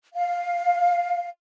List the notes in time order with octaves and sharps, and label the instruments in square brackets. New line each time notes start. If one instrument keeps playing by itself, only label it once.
[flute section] F5